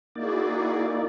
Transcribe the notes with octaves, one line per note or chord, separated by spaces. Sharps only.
A#3 D#4 E4 F#4 G#4 D5